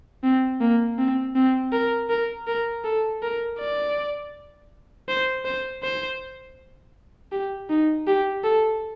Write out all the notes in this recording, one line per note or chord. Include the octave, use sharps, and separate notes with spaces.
C4
A#3
C4
C4
A#4
A#4
A#4
A4
A#4
D5
C5
C5
C5
G4
D#4
G4
A4